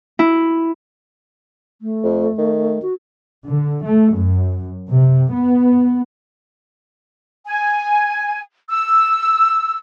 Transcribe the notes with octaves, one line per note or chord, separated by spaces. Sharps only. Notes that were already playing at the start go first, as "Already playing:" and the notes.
E4
A3
F2
D#3
F#4
D3
A3
F#2
C3
B3
G#5
E6